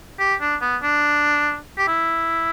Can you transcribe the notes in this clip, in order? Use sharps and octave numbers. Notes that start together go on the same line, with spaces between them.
G4
D4
B3
D4
G4
E4